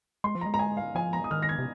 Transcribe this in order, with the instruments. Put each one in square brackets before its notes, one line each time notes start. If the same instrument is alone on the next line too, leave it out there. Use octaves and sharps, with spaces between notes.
[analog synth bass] G#3 [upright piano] C6
[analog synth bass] F3
[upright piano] A#5
[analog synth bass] G#3
[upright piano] A#5
G#5
F5
[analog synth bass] F3 [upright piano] G#5
[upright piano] A#5
D#6
[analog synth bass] D#3 [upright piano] F6
[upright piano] A#6
G#6
[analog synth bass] C3